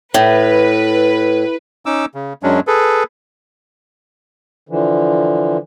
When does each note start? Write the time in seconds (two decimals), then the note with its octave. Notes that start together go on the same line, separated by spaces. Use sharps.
0.14 A2 B4
1.86 C#4 D#4 D6 E6
2.15 C#3
2.43 F#2 F#3 G#3 C#4 D4
2.67 G#4 A4 B4
4.69 D3 E3 F3